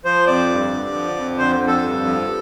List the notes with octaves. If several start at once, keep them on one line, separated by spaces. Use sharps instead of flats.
F3 C5
F2 D5
G2
D3
F3
F2
D3 C5
F2
A4
G2
F3